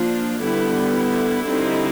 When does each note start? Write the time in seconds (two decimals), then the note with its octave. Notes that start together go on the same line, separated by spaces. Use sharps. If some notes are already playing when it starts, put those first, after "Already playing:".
Already playing: F3 A#3 D4 F4
0.41 D3 G3 B3 E4
0.93 E4
1.46 D3 G3 C4 D#4